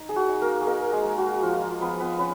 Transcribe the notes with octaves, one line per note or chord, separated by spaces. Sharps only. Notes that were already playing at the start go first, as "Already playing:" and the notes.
Already playing: D#4
G#4
F#4
D#4
A#3 A#4
G#4
A#3 D#4 A#4
G#3 G#4
G#3
F#4
F3 F4
F4
F3 B3 B4
B3 B4
B3 C#4 B4